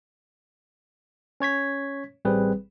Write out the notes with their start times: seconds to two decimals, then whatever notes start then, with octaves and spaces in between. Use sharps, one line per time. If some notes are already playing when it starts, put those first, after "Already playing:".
1.40 C#4 C#5 G#6 B6
2.25 A1 G3 C4 G#4 B4